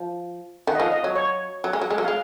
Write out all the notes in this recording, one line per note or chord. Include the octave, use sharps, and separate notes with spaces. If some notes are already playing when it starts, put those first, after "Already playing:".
Already playing: F3
D#3 F#5
D#5
F3 F5
D#5
F#3 C#5
C#5
F#3
G#3
F#3
G#3
F#3
G#3 F5